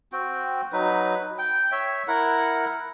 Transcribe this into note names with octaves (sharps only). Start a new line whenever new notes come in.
C4 F#4 G5
F#3 D#4 B4
G5
C#5 E5
E4 A#4 F#5